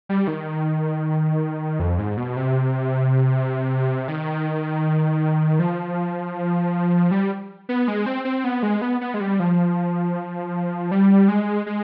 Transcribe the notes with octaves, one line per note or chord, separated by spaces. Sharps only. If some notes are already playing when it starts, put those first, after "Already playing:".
G3
D#3
F2
G#2
B2
C3
D#3
F3
G3
B3
G#3
C4
C4
B3
G#3
B3
B3
G#3
G3
F3
G3
G#3
G#3